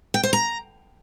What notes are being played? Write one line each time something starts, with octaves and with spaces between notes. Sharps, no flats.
G5
C5
A#5